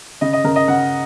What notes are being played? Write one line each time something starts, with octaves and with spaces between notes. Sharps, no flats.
C#3 D#5
D#5
C#3 A#4
D#5
C#3 F#5